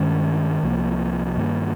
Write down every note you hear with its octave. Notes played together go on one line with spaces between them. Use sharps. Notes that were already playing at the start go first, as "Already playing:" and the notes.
Already playing: G2 D#3 G#3 C#4
C2 C3 F3 A#3
G2 D#3 A#3